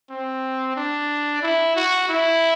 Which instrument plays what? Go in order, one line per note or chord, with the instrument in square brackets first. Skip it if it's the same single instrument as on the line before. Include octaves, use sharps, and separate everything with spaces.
[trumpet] C4
D4
E4
F#4
E4